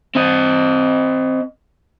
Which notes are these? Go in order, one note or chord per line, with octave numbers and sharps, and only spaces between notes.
C4 D#5